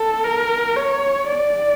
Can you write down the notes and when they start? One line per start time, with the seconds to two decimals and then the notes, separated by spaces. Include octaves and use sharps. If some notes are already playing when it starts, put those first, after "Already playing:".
Already playing: A4
0.24 A#4
0.76 C#5
1.27 D5